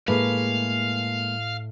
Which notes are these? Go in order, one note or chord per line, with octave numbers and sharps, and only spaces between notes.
A2 G#3 A#3 B4 F5